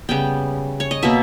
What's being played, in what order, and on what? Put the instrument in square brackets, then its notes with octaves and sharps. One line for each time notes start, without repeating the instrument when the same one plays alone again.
[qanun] C#3 G3 B3 G5
C#5
D#5
B2 A#3 E5